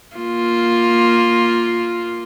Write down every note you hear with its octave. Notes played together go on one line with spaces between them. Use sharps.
A#3 F4